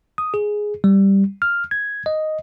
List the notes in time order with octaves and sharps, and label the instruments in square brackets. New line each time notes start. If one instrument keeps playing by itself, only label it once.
[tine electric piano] D#6
G#4
G3
F6
G#6
D#5